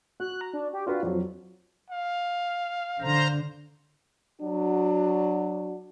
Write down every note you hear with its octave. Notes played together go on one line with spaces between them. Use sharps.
F#4 F#6
A#5
D4
G4
D4 F4 F#4 B4
F2 F3 F#3
F5
D3 C5 A#5
F#3 D4 F#4